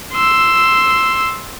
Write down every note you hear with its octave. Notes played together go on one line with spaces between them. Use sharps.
C6 E6